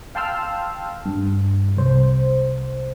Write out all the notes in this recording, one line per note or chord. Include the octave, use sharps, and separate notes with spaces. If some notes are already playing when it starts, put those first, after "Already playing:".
F5 G5 A5 C6 E6 F6
G2
C2 C5